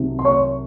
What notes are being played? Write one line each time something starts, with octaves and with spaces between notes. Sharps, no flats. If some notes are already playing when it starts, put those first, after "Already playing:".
Already playing: C2 C3 D#3 F#3
C6
C#5 C#6